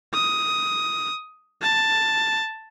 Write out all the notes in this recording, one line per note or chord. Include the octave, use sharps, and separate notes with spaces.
D#6
A5